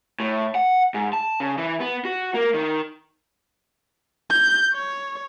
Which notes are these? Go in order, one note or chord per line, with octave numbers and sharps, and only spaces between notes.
A2
F#5
G#2
A5
C#3
E3
B3
F#4
A#3
D#3
G6
C#5